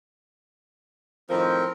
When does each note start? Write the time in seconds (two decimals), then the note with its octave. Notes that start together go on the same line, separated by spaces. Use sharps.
1.30 A2 D#3 F3 C4 A#4